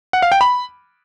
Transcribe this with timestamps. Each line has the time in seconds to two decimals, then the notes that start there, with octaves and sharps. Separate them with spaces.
0.13 F#5
0.22 F5
0.32 G5
0.41 B5